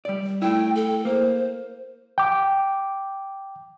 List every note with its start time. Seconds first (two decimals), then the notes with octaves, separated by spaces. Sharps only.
0.05 G3 D5
0.42 A3 E4 G5
0.75 A4
1.05 A#3 C5
2.18 G5 D6